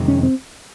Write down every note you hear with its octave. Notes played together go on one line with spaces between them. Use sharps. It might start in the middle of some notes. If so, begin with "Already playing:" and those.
Already playing: F2 C3 D#3 G#3
C#4
C4